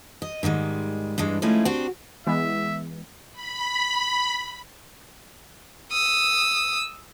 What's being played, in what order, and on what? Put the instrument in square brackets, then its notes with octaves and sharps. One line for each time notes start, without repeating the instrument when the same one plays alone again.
[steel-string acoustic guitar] D#5
G#2 D#3 G3 G#3
G2 E3 G#3 D4
D#3 F3 G#3 A3 C#4 E4
C4 D4 F#4 G4
[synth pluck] E3 G#3 B3 [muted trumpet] E5
[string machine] B5
[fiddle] D#6 E6